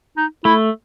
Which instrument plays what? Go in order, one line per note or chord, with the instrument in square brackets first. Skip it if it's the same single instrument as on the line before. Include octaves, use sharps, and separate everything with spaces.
[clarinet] D#4
[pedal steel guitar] A3 [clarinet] E4